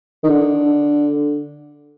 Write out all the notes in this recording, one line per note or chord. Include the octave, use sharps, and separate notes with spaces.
D#3
D3